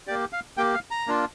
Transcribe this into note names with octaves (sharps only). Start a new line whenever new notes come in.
A#3 G4 D5
F5
A#3 G4 G5
F5
A#5
A#3 D4 F4